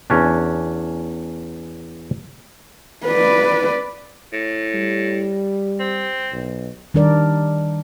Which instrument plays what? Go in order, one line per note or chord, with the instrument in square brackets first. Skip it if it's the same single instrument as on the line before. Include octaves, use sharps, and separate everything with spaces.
[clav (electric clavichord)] E2 C#4 D4
[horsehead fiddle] B4 D5
[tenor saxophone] A2
[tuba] G3
[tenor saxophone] C4
[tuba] B1
[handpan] D#3 G3 D4 A#4 D5